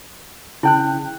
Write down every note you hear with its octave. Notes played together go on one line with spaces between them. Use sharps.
C#3 E4 G5 F#6